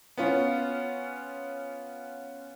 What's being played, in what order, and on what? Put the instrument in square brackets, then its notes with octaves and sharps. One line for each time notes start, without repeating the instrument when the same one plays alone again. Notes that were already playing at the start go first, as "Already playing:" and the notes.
[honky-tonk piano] B3 C#4 F4